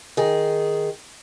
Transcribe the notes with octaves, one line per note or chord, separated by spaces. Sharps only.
D#3 G#4